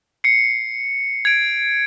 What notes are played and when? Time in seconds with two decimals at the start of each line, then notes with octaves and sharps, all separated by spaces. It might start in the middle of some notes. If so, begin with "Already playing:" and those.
0.24 C7 C#7
1.25 G#6 D7